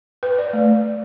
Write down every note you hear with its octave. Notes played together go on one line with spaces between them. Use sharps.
B4
D5
A3